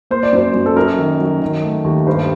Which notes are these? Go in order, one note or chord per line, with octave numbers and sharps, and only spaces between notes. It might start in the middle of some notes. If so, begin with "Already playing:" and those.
A#3 C5
D5
F#2 C5
F#2
A4
F#2 A#4
D#3
F#3
D#3
A3
D#2
G2 C5